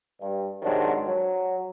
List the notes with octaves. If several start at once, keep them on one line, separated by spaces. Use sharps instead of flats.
G2
G#2 C3 D#3 F#3 C4 D4
F#3